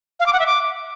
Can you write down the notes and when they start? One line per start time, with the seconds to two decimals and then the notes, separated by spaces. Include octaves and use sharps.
0.20 F5
0.26 D6
0.33 F#5
0.40 E5
0.46 D6